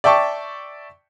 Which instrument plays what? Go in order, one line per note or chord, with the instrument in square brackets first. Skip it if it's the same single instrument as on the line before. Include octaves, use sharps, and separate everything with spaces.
[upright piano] D5 E5 G5 A5 C#6